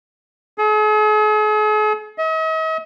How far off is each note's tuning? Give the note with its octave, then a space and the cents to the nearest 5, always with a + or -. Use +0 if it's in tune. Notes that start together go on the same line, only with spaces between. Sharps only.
G#4 +45
D#5 +45